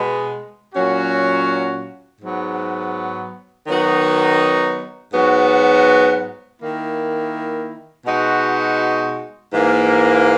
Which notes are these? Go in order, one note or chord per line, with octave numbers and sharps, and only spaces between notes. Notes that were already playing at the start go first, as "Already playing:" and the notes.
Already playing: B2 G#3 B3
A#2 F#3 C#4 F#4
G#2 F#3 B3
D#3 F#3 B3 D#4 F#4
G#2 F#3 B3 F#4
D#3 A#3 E4
B2 G#3 D#4 F#4
G#2 E3 A#3